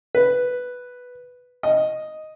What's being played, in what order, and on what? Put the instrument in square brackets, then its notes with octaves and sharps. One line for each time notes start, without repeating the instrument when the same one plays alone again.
[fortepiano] B4
D#5